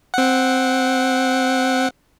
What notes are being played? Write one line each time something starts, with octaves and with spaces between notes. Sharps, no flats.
C4 F#5